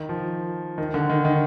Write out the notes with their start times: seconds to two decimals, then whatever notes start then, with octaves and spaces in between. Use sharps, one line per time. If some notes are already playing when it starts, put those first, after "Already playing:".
Already playing: D#3
0.09 F3
0.78 D#3
0.94 D3
1.10 D#3
1.25 D#3